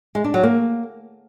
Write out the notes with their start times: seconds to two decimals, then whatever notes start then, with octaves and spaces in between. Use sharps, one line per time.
0.15 G#3
0.24 D4
0.34 F#3
0.43 A#3